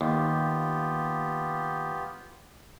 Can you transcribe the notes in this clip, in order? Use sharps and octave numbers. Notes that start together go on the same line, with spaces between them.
D#2 B3 F4 G4